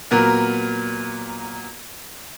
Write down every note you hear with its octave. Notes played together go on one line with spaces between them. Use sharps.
A#2 F#3 B3 A#4